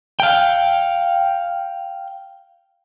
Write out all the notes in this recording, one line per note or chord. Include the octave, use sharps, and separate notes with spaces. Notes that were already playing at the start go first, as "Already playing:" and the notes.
F5 G5